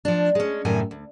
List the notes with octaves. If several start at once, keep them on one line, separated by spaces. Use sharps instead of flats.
F3 D4
G#3 C#4
F#2 A2 C3 D#3 G3 G#5
D2